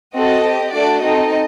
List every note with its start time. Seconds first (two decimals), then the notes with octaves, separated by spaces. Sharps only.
0.15 C4 F#4 A4 D#5
0.44 C4 G4
0.74 A3 D4 F#4 A4 D5
1.02 C4 D#4 A4 D#5